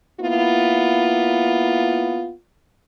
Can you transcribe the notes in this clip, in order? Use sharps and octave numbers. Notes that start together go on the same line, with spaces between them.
A#3 B3 E4 F4